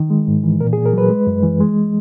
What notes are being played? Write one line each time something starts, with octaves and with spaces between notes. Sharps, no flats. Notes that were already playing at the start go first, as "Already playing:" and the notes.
Already playing: D#3
G#3
G#2
E3
A#2 A#4
G#4
A#2
A#4
F#3 B4
G#3
F#2
E3
G#3